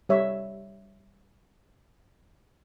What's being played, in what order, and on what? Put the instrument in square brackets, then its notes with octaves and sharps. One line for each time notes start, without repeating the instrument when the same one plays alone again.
[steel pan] G3 C#5 E5